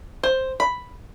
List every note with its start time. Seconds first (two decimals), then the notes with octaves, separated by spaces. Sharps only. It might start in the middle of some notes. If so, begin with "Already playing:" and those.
0.23 C5
0.60 B5